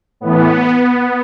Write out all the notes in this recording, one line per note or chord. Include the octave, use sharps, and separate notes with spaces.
A2 E3 B3